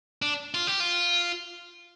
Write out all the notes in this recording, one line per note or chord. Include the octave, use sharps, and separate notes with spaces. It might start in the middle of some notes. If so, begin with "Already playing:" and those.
D4
F4
G4
F4